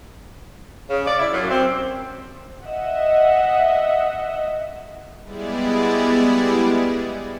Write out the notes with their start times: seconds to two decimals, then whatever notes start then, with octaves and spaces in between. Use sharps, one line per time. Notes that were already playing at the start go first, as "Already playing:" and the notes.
0.89 C#3
1.06 D5
1.18 E4
1.33 F#2
1.50 C4
2.64 D#5 E5 F#5
5.24 G3 G#3 B3 E4 G#4 D5